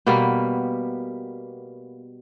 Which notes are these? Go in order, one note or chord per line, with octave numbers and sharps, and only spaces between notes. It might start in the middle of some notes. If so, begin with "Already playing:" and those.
B2 G3 A#3 B3